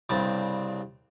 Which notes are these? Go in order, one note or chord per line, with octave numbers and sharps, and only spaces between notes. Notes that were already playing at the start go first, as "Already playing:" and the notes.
C2 G2 C#3 C4 A5